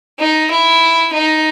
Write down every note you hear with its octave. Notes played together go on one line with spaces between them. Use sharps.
D#4
E4
D#4